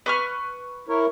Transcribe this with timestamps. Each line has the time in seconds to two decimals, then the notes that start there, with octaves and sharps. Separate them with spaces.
0.06 B4 C#6 F6
0.89 E4 A#4 C#5